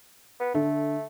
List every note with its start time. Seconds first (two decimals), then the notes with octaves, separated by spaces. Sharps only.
0.40 B3
0.54 D3 A3